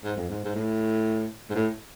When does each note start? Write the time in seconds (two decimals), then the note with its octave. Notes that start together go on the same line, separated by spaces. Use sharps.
0.05 G#2
0.17 F2
0.30 G#2
0.45 G#2
0.55 A2
1.50 G#2
1.55 A2